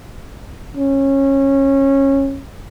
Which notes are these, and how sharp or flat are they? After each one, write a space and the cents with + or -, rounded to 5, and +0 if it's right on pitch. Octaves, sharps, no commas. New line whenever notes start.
C#4 -20